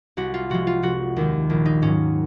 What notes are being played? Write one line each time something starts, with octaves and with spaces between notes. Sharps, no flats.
C2 F#4
F4
C3 F3 G#3 F#4
F4
F1 F#4
D#2 D#3 G#3
A#1
D#4
G#2 F#3 C#4